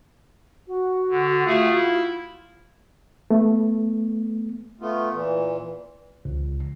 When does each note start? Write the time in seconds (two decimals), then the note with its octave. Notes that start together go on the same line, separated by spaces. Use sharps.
0.68 F#4
1.10 D3
1.46 A3 F4 G#4
1.74 E4
3.30 A3 B3
4.81 A3 B3 F4
5.13 A#2 E3
6.25 C#2